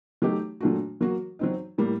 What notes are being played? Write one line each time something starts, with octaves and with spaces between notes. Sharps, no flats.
F#3 A3 D#4 G4
A#2 F#3 A3 D4 F#4
F#3 A#3 F#4
F#3 C4 D#4
A2 G3 A#3